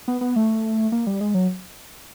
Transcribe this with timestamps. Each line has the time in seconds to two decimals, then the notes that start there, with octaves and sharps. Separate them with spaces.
0.08 B3
0.21 B3
0.36 A3
0.92 A#3
1.07 G3
1.21 G#3
1.34 F#3